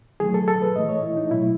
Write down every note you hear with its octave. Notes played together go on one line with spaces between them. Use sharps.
D#3 F#3 A3 G#4
A4
A4
B4
A2 E3 A3 D#5
C#5
E4
D#4
B2 F#3 A3 E4